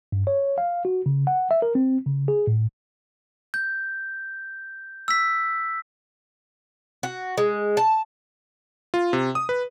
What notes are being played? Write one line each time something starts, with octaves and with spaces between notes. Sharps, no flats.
G2
C#5
F5
F#4
C#3
F#5
E5
A#4
C4
C#3
G#4
A2
G6
E6 B6
F#4
G#3
A5
F4
C3
D#6
B4